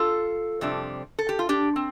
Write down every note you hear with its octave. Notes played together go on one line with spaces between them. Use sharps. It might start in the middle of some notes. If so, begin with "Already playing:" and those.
Already playing: F4 A4
F2 C3 G3 D4
A4
G4
F4
D4 G4
C4